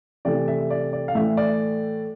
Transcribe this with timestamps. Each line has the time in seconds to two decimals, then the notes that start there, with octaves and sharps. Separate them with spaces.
0.25 C3 E3 A3 D5
0.48 E5
0.70 D5
0.93 D5
1.08 F5
1.15 A2 E3 A3 E5
1.37 D5